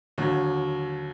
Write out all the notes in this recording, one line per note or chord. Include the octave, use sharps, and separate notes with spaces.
D#2 D3 F#3